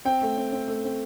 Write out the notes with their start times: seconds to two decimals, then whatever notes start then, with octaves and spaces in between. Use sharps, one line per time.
0.05 C4 G5
0.21 A3
0.37 C4
0.52 C4
0.68 A3
0.84 C4